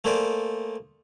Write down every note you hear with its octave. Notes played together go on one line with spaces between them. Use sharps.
A3 A#3 G#4 C5 D5